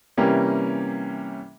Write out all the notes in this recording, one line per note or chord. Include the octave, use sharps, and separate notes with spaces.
C3 E3 G3 A#3 C#4